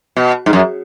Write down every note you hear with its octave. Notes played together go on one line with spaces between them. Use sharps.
B2
G#2
F#2